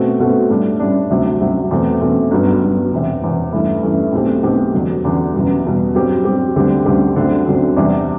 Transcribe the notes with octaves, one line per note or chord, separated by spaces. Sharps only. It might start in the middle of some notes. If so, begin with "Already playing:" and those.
Already playing: B2 A3 C4 F#4
B2 A3 C4 F#4
A2 G3 D4
A2 G3 D4
D2 C3 F#3
D2 C3 F#3
E2 B2 A3 C4
E2 B2 A3 C4
G1 G2 F#3 B3
G1 G2 F#3 B3
E1 E2 C3
E1 E2 C3
G2 E3 A3 E4
G2 E3 A3 E4
B1 B2 A3 C4 G4
B1 B2 A3 C4 G4
E2 D3 F#3
E2 D3 F#3
F#1 E2 B2 G3
F#1 E2 B2 G3
G2 F#3 C4 G4
G2 F#3 C4 G4
D2 D3 G3 C4 G4
D2 D3 G3 C4 G4
D2 D3 F#3 C4
D2 D3 F#3 C4
E2 C3 G3 D4